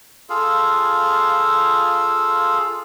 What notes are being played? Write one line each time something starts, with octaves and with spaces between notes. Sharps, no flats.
F4 G#4 A4 F5